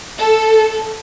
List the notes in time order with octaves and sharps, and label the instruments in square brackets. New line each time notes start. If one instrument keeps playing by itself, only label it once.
[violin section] A4